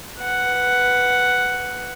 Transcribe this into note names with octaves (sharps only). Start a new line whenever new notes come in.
B4 F#5